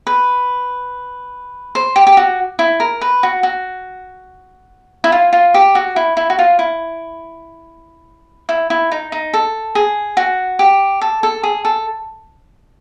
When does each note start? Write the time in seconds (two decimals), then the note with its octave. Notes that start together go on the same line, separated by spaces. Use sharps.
0.07 B4
1.75 C5
1.96 G4
2.07 G4
2.17 F#4
2.59 E4
2.80 A#4
3.01 B4
3.23 F#4
3.43 F#4
5.04 E4
5.12 F4
5.33 F4
5.54 G4
5.75 F#4
5.96 E4
6.17 E4
6.30 F#4
6.39 F4
6.59 E4
8.49 E4
8.70 E4
8.92 D#4
9.12 D#4
9.34 A4
9.75 G#4
10.17 F#4
10.59 G4
11.01 A4
11.23 A4
11.43 G#4
11.65 A4